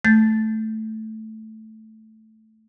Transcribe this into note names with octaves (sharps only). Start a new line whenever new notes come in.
A3 G6 A6